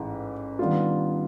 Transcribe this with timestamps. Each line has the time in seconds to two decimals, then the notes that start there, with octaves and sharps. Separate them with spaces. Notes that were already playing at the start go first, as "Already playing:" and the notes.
Already playing: A1 G#2 E3
0.59 D#3 G3 B3 D4 F4